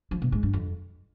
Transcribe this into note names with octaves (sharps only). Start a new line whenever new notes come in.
F3
B2
G#2
G2
F2